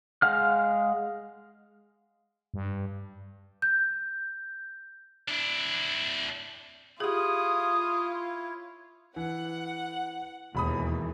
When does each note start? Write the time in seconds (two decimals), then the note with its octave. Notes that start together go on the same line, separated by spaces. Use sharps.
0.22 G#3 F5 F#5 F6
2.54 G2
3.62 G6
5.28 D4 E4
7.00 E4 F4 G4 G#4 C#5 D#6
9.16 E3 F#5
10.55 E1 D#2 E3 B5 D#6